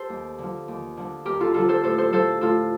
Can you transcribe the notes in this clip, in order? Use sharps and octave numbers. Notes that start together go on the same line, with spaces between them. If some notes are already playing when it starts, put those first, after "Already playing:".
Already playing: G4 A4 C5
D#2
D3 F3
D#2
D3 F3
D#2 G4 A#4
F4 A4
D3 F3 F4 A4
A4 C5
A2 A4 C5
A4 C5
F3 A4 C5
A2 F4 A4